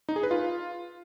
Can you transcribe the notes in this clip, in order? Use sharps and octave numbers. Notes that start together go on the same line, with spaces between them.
D#4
G#4
B4
F4